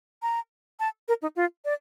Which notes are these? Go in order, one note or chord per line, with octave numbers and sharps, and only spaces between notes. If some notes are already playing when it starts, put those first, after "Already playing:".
A#5
A5
A#4
D#4
F4
D5